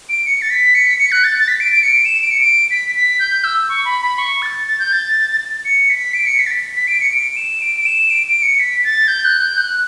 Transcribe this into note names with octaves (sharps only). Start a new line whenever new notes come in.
D7
C#7
A6
B6
C#7
B6
C#7
F#6
A6
A6
B6
D7
D7
C#7
D7
E7
D7
C#7
D7
B6
B6
G6
E6
C#6
B5
B5
C#6
A6
A6
G6
A6
C#7
B6
D7
C#7
B6
A6
B6
B6
D7
C#7
D7
E7
D7
D7
E7
D7
D7
C#7
B6
A6
G6
F#6
G6
F#6